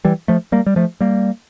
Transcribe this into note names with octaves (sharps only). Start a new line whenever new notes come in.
E3 G3
F3 A3
G3 A#3
G3
F3 A3
G3 A#3